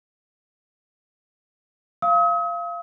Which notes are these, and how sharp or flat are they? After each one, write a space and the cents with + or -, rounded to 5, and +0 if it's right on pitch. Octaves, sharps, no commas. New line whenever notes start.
F5 -20 D#6 +45